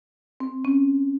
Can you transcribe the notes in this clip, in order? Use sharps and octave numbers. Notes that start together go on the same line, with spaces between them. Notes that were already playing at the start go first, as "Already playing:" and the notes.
C4
C#4